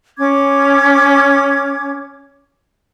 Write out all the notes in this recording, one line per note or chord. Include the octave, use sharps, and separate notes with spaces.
C#4 D6 G#6